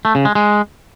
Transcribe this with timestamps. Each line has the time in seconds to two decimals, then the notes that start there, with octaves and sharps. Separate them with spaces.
0.05 A3
0.15 C#3
0.25 G#3
0.35 G#3